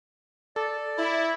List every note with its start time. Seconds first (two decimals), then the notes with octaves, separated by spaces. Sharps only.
0.56 A4 D5
0.98 E4